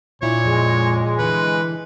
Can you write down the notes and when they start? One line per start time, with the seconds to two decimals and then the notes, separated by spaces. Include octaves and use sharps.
0.22 A#2 D4 E4 C#5
0.45 F2 G#3
1.19 D3 E3 B4